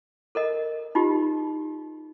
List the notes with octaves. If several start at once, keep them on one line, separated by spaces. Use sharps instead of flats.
A4 A#4 D#5
D#4 F4 G4